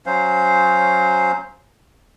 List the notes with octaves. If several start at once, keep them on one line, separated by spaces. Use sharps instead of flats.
F#3 C#4 C5 F5